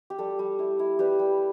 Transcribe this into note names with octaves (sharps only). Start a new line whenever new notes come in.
G4
G3 A4
G3
E4
E4
G3 G4 B4
G3